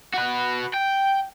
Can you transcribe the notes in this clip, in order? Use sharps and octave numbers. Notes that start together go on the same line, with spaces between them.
F#4 B4
G5